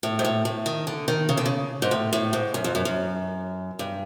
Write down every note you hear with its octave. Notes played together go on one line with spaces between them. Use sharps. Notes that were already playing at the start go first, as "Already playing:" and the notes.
A2
G#2
A2
A2
D#3
D3
D#3
C#3
D3
C#3
G#2
A2
A2
G#2
F#2
F2
F#2
F#2
G2